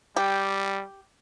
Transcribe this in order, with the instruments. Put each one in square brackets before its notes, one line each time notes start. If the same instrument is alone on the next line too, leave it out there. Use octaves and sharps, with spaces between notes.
[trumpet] G3 [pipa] G4